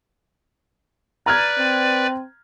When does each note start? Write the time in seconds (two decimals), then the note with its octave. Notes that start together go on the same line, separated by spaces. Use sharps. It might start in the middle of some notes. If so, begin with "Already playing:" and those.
1.26 B4 D5 A#5 F6 G#6
1.59 C4